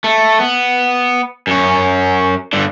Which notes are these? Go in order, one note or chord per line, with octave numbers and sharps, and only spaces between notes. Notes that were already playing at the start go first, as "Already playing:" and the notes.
A3
B3
F#2 C#4
G2 D3